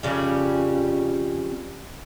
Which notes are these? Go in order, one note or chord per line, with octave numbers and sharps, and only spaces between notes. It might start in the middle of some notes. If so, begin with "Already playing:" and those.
F2 C#3 G3